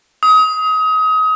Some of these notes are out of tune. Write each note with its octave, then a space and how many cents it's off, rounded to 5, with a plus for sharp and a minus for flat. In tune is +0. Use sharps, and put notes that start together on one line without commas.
D#6 +30